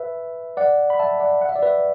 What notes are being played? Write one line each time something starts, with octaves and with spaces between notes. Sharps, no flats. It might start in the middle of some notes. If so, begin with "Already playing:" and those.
Already playing: B4 E5
D5 F#5
B5
E5 A5
D5 F#5
F#5
E5
D5
B4 E5